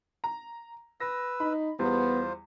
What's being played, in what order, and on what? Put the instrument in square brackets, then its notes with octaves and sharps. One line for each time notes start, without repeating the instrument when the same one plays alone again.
[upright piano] A#5
[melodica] B4 E6 [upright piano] A#6
[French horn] D#4 [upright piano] B5
[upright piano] E2 G3 [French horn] B3 [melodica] F4 C5